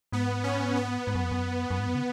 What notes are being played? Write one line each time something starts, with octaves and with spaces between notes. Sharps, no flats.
G#2 B3
C#4
B3
G#2
F#2
F2
F#2
F#2
G#2
F#2
C#3